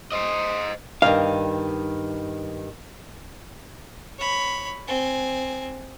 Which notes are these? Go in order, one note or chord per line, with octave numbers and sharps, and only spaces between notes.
C5 D#5
G2 D#3 F5
C#5 B5
C4 G#5